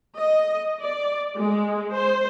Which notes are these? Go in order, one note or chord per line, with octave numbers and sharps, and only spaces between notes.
D#5
D5
G#3
C5